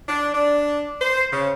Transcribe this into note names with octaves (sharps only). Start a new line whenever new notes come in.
D4
D4
C5
C#3